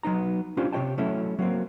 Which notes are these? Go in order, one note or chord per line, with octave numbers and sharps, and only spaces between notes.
F#3 B3 D#4 A#5
C#4 D4 F4 G4 C5
C3 G4 C#5 D5 G5 A5
F#3 A3 C#4 E4
F#3 A#3 C4